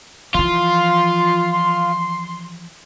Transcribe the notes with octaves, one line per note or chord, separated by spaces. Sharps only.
E3 F3 F4 C6